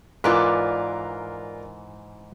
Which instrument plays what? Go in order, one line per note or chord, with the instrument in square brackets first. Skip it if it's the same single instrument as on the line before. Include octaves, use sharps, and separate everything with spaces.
[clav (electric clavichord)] G#2 E3 [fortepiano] F4 A#4 [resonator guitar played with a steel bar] B4 D5